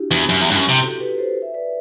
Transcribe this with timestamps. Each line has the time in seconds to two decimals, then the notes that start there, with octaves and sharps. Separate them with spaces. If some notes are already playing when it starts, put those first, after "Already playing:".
Already playing: D4 E4 F#4 G4
0.11 E2
0.29 F#2
0.41 E2
0.50 G2
0.55 F#2
0.69 C3
0.82 F#4 A4
1.00 G4 B4
1.18 A4 C5
1.42 E5
1.54 B4 D5